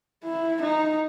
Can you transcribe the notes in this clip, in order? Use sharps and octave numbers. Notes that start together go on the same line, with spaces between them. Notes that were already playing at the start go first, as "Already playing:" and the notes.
E4
D#4